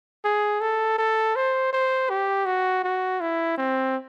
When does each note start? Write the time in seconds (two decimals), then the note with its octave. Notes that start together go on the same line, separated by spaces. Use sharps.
0.25 G#4
0.61 A4
0.98 A4
1.36 C5
1.73 C5
2.10 G4
2.46 F#4
2.84 F#4
3.21 E4
3.58 C4